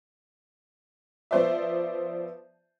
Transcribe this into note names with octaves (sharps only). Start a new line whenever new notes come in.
F3 B3 C5 D5 E5